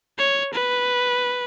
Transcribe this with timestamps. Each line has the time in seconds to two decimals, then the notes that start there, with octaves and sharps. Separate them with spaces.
0.18 C#5
0.53 B4